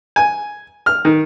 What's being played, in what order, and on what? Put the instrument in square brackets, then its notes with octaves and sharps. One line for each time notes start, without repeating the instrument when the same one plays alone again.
[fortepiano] G#5
F6
D#3